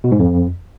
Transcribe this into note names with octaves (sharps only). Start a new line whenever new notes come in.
B2
G#2
F2